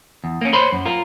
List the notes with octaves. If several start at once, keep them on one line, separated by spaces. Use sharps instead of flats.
E2
A#3 C#4
C5 C#5 B5 C6
F#2
F4 A#4